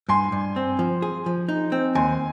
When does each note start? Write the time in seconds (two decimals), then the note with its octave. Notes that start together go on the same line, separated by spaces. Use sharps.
0.09 G2 G#5 C6
0.32 G2
0.56 C4
0.79 F3
1.02 G#4
1.26 F3
1.49 D#4
1.72 C4
1.95 D#2 G#5 C6